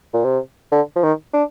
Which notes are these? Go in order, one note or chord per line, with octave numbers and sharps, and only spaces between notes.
A#2
C3
D3
F3
D#3
D4